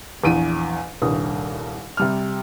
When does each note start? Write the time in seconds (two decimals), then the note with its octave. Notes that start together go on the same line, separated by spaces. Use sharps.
0.24 A#1 E2 D7 D#7
1.02 D#1 C2 G2 D#6
1.97 C3 G3 F6